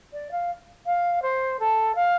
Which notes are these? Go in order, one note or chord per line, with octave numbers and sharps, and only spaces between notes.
D5
F5
F5
C5
A4
F5